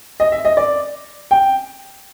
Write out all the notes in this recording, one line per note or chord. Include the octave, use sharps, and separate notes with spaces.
D#5
E5
D#5
D5
G5